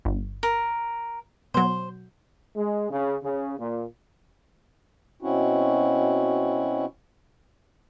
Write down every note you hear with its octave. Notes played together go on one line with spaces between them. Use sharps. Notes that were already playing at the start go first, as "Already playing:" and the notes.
G1
A#4
B2 F#3 C5
G#3
C#3
C#3
A#2
B2 C4 C#4 E4 F#4